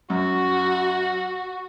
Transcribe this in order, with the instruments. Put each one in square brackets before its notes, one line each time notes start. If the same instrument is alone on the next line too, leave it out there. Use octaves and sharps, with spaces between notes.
[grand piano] F#2 [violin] F#4